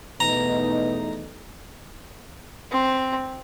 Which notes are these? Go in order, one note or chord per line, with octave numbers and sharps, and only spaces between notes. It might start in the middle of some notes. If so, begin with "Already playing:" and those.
E2 B2 A3 D#4 A#5
C4